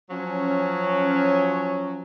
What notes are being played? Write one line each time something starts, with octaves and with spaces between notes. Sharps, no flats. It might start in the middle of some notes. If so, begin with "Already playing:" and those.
F3 F#3 C#4